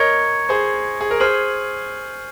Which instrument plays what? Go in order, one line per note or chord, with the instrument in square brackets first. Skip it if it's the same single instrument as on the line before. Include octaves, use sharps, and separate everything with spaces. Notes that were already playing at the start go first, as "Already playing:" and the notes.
Already playing: [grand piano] A#4 C#5 D#5 [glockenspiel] C#6 G#6 C#7
[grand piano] G#4 C5
G#4
A#4
[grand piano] G#4 C5 [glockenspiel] F6 C7 D#7 F#7